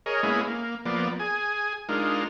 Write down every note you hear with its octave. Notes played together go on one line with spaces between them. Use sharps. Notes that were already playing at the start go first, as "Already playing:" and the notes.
G#4 A#4 C#5 D#5
G#3 A#3 B3 C#4 E4 G#4
A#3
F3 A#3 B3 D5
G#4 G#5
G#3 D4 D#4 F4 A#4